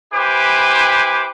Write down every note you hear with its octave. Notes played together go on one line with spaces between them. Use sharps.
E4 G4 B4 C5 G#5 D6